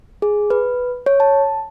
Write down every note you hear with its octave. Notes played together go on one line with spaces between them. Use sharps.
G#4
B4
C#5
A5